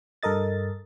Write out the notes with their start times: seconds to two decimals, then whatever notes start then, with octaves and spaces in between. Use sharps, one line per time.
0.23 G2 A4 A#4 D#5 A6